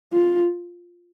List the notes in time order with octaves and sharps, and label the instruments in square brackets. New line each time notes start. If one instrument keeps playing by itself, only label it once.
[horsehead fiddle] F4